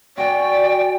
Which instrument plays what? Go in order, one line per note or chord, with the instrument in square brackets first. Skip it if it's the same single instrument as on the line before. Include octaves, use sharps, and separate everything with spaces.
[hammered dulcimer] F#4 G#5 [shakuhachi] D5 [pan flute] G5